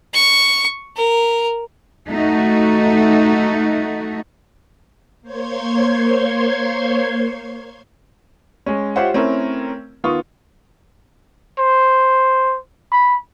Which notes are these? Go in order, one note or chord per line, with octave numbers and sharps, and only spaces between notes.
C#6
A#4
A3 D#4 F#4
A#3 C5 C#5 C6 G#6
G#3 C#4
F4 G4 C5 C#5 E5 F#5
A3 C4 C#4 E4 A#4
D#3 B3 F4 C#6 D#6
C5
B5